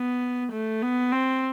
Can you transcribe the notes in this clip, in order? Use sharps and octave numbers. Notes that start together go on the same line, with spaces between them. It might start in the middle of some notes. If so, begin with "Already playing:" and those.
Already playing: B3
A3
B3
C4